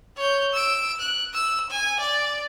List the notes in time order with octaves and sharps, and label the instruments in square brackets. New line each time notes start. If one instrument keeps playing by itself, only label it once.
[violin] C#5 G6
E6 D7
F#6
E6
G#5
D5